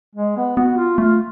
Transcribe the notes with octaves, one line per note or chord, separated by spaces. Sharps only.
G#3
B3
B3 F#4
F4
A3 F4